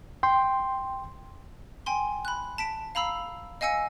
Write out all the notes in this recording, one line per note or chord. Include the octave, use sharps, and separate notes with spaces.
G5 C6
G5 G#5 C6
B5 F#6
A5 B6 D7
F5 A#5 B5 E6 C7
D#5 F5 G#5 E6 C#7